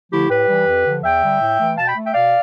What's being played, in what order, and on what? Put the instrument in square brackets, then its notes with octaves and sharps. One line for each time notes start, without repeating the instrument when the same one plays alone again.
[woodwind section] D3 F3 A3 E4 G4
A2 G4 B4
E3 G3
F2
D3
F3
E2 E5 G5
D3 G3
A2
E3 A3
B2 F5 A5
G5 B5
A3
E5 G5
B2 D5 F5